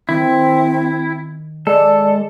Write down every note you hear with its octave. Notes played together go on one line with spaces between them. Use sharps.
D#3 C4 E4
G#3 A4 D5